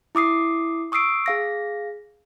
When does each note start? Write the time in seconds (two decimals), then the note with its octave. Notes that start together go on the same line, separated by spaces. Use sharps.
0.15 E4 D6 D#6 C7
0.92 C#6 D#6 E6 C7 D7
1.26 G#4 F5 A#6